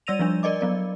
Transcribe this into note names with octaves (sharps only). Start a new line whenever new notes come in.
G3 D5 E6 A#6 D#7 F7
F3 G3 D4
A#4 D5 D#5 D6
F#3 B3 D5